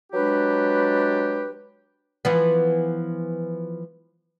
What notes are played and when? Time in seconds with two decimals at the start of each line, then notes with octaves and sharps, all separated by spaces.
0.13 F#3 G#3 D4 G4 B4
2.25 E3 F3 B3